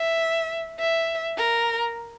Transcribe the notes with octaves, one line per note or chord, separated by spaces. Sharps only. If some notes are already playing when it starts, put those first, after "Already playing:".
Already playing: E5
E5
A#4